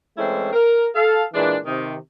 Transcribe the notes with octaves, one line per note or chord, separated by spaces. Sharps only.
E3 G#3 A3 C4 C#4 E4
A#4
A4 F5
A#2 E3 G#3 D4
C3 D#3